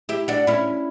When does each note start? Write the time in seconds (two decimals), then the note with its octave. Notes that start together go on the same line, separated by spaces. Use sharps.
0.09 E4 G4
0.28 D4 F#4
0.47 C#4 E4